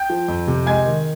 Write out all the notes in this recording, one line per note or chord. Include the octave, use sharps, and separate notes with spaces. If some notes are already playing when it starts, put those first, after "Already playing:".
Already playing: G5 G6
F3
F2
C3
G#3 G#5 G#6
D#3